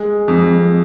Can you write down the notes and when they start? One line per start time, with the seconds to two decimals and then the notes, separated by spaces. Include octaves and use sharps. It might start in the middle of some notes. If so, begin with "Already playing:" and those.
Already playing: G#3
0.28 F2